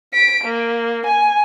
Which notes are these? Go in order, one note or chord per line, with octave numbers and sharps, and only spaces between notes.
B6 D7
A#3
G#5